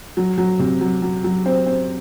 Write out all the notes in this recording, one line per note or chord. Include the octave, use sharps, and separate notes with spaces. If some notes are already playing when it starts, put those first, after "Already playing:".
F#3
F#3
C3
F#3
F#3
F#3
C4
C4